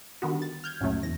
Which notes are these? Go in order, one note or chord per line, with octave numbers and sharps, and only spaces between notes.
D3 D#3 G3 B3 F#4
A6
F6 G6 G#6
C#2 F#2 A#2 C#3 F#3 A3
E2 A#6